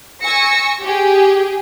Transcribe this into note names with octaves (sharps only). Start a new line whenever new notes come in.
G#5 C#6 E6 A#6 C#7
G4 G#4